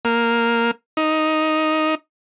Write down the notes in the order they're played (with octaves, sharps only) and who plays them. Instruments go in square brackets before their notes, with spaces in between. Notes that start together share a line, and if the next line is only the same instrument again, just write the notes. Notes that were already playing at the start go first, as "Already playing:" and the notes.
[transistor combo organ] A#3
D#4